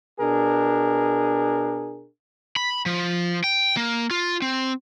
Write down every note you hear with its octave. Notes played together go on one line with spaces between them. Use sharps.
B2 D4 G#4 A#4
B5
F3
G5
A#3
F4
C4